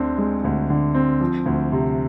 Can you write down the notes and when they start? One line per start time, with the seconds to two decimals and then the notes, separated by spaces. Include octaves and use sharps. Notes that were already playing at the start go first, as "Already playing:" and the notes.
Already playing: D2 D3 C4
0.18 G#3
0.44 D2
0.70 D3
0.94 C4
1.21 F3
1.46 D2
1.72 C3